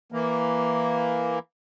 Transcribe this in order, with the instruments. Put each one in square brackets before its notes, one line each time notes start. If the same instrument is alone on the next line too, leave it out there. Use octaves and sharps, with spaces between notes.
[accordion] E3 A#3